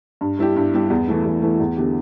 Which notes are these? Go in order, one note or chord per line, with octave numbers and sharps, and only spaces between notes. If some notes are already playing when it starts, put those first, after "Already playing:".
G2
G3 E4 G4
G2
G3 E4 G4
E2
E3 A3 E4
E2
E3 A3 E4
E2
D3 B3 E4 G4